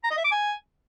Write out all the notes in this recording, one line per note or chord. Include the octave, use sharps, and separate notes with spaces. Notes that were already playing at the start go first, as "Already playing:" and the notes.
A#5
D#5
E5
D6
G#5